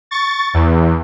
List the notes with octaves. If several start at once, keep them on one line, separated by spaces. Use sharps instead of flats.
C#6 A6
E2